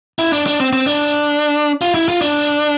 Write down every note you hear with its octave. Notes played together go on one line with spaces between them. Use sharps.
E4
D4
D4
C4
C4
D4
F4
E4
F4
D4